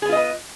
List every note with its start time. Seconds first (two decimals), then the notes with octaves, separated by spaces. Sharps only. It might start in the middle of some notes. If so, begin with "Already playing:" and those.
0.02 G#4
0.06 B3
0.09 F4
0.12 D#5
0.16 B4